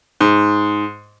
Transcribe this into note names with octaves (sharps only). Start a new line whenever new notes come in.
G#2